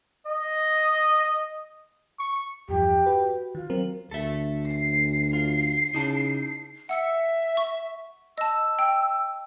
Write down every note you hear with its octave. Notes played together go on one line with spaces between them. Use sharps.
D#5
C#6
E2 G2 F3 G4
F#4 B4
D#3 F4
F#3 C4 A#4
D2 A4 E5
C7
F4
C#3 D#4 E4 A5
E5 F#5 E6 C#7
C#6
D#5 A5 E6
G5